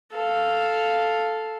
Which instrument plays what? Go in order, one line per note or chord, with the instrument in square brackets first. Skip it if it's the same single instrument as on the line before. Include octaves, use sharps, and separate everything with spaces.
[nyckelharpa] A4 F5